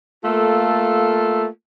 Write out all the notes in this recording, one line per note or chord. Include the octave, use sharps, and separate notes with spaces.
A3 A#3 F4 A4